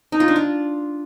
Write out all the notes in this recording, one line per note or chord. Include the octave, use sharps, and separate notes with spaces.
D#4
F4
D4
F4